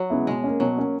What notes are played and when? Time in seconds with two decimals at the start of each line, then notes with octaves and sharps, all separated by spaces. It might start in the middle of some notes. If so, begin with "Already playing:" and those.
Already playing: F#3
0.10 C#3 G#3 B3 E4
0.27 B2 G#3
0.44 A#3 C#4
0.60 B2 F#3
0.77 A#3 C#4